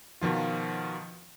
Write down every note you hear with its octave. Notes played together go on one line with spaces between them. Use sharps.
B2 D#3 F3 F4